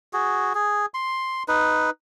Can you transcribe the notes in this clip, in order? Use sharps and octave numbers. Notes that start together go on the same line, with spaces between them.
F#4 G#4
G#4
C6
D#4 B4